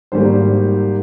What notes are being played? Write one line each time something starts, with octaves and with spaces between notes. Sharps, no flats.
G#1 G#2 G3 A#3 C5